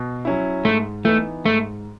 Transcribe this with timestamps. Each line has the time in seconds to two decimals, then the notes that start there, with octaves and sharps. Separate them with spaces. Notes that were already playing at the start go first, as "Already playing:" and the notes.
Already playing: B2
0.25 F#3 C#4 E4
0.65 G#2 A3
1.04 E3 A3 B3 D#4
1.45 G#2 A3